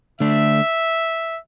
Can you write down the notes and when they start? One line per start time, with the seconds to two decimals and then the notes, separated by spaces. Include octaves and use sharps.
0.20 D3 A3 D4 E5